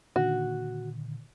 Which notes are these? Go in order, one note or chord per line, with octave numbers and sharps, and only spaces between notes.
A#2 D3 D#3 F#4